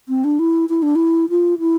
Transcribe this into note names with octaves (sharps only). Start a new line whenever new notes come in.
C4
D4
E4
E4
D4
E4
F4
E4